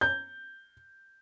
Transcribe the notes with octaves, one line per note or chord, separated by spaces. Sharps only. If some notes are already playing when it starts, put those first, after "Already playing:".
G6